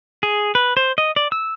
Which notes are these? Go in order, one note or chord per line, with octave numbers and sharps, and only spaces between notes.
G#4
B4
C5
D#5
D5
E6